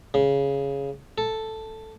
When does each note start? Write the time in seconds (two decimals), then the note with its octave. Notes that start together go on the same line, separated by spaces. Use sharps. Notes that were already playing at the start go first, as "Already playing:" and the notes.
0.14 C#3
1.18 A4